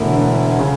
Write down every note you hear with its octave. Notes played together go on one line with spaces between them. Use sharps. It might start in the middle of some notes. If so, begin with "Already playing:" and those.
Already playing: E1 D2 D3 A3 E4
C#3